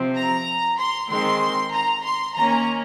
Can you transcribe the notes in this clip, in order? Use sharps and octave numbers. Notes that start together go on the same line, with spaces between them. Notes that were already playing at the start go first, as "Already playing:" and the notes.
Already playing: C3 F3 C4
A#5
C6
D#3 G#3 C4 C6
A#5
C6
D#3 A#3 C#4 A#5